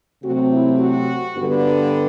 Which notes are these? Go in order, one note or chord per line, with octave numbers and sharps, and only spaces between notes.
C3 F#3 A3 C4 F#4
E4
F#4
G2 D3 G3 B3